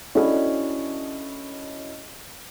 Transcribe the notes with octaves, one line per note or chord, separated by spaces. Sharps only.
C#4 D4 E4 F#4 A4 D#5